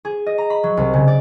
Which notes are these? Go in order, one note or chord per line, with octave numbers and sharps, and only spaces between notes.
G#4
D#5
A#5
B5
F#3
C2
C#3
D5